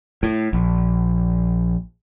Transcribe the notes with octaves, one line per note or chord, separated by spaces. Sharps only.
A2
A#1